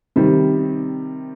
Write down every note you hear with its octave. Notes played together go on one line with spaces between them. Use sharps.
C3 D#3 G3